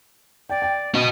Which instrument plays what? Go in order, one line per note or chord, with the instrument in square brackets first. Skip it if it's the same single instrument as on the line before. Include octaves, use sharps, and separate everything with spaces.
[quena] D5 [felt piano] G5
[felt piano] G5
[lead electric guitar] F#4 D#5